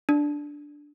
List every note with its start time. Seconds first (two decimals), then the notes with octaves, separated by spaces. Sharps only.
0.09 D4